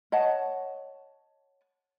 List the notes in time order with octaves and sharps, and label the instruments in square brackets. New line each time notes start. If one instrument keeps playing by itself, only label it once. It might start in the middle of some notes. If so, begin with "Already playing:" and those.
[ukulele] C#5 D#5 F#5 A5